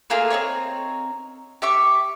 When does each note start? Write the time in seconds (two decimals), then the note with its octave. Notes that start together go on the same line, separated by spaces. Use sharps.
0.10 A3 A#3 F4 G#4
0.30 C4 C#4 D#4 C#5
1.62 G4 E5 C#6